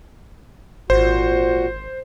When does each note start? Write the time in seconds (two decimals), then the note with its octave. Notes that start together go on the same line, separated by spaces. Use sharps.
0.90 G#1 A#2 F#4 C5